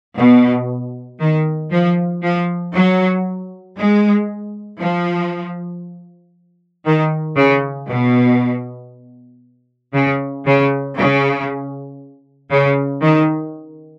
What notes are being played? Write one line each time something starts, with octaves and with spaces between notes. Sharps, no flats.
B2
D#3
F3
F3
F#3
G#3
F3
D#3
C#3
B2
C#3
C#3
C#3
C#3
D#3